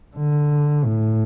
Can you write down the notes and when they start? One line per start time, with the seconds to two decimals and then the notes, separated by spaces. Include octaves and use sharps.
0.17 D3
0.84 A2